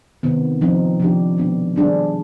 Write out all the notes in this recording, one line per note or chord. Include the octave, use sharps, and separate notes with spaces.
C3 D#3 B3
F3 C4 D#4
C3 F3 B3 D4 G4
B2 G#3 B3 D4
D#3 G3 D4 G#4